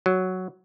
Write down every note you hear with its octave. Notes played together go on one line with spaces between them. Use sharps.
F#3